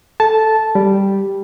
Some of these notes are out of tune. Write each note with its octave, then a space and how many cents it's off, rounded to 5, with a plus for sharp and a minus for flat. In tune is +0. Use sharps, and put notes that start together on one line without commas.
A4 +0 A5 -10
G3 +0 G4 +0